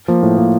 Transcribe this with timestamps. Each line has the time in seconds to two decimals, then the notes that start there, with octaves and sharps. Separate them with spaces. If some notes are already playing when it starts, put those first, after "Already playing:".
0.08 F3 A#3
0.23 A2
0.38 F3 A#3